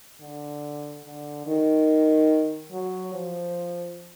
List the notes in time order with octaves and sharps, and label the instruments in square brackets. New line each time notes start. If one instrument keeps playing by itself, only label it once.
[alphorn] D3
D3
D#3
F#3
F3